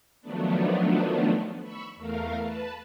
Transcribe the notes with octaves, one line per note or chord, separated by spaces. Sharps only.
D#3 F3 F#3 A3 B3 D4
B5 C#6 E6
E2 A3 A#4 F5
B4 A5